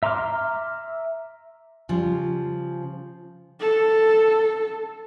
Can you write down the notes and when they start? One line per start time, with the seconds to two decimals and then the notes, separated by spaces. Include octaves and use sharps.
0.03 E5 A#5 C6 D6 F6
1.89 C#3 F3 G3
3.60 A4